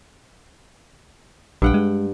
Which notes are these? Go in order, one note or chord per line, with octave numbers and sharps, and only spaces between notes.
A#1 G2 F#5 G5
G#3